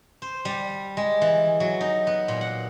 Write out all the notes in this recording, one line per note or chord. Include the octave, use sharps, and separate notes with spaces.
C5
G3
G#3
E3
F#3
D#4
B3
A#2
F#5